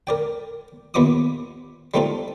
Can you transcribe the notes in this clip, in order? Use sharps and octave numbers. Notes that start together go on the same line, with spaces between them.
A#4 D5 G5
D#2 A#2 B3 D#5 D6 D#6
G3 A3 C4 D#4 F4 A4